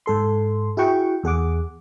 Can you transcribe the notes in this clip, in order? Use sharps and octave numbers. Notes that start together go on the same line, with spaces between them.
G#2 A4 C6
E4 F#4 G#4 F#5 G5 C#6
E2 G#4 F#5 D6